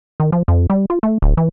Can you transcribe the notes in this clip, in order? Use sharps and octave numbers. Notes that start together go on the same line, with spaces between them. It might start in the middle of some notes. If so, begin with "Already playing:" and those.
D#3
F3
F2
G3
F4
A3
D1
E3